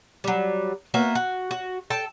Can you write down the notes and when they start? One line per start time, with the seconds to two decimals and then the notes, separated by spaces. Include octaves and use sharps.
0.24 F#3 G3
0.94 A#3 B3 F#4 E5
1.15 F#4
1.51 F#4
1.90 A4 G5 A5